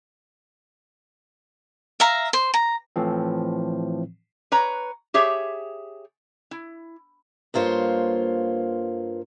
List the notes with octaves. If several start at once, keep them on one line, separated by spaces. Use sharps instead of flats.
E5 F5 A#5
C5
A#5
A2 E3 F3 C4
B4 C#5 A#5
G4 G#4 C#5 E5
E4
G2 A#3 F4 C5 C#5